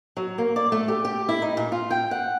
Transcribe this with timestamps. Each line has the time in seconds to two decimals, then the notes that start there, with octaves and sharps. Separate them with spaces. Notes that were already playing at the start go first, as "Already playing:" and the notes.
0.17 F#3
0.38 A#3
0.56 D5
0.72 A3
0.88 G4
1.05 G4
1.29 E4
1.42 D#4
1.57 A#2
1.72 F4
1.91 G5
2.11 F#5